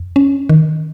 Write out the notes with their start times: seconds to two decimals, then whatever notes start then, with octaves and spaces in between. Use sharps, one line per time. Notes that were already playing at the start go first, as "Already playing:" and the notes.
Already playing: F2
0.16 C#4
0.49 D#3